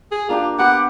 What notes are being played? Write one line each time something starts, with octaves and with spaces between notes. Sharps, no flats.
G#4
A#3 D4 F4 G4
B3 G4 F#5